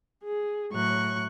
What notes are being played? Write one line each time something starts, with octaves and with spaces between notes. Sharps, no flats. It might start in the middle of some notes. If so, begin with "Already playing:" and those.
G#4
A2 F#3 C#6 F#6